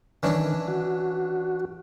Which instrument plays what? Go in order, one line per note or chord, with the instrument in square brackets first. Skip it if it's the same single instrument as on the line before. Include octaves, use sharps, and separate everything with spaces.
[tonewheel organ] D#3 [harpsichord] E3 C#4 D4
[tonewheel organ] F#4